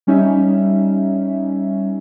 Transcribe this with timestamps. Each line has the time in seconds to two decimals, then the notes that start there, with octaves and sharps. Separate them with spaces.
0.07 G3 C#4 D#4 E5